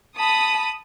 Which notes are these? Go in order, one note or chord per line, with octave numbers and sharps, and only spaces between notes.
A5 B5 D#6